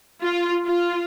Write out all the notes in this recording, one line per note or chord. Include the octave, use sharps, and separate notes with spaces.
F4
F4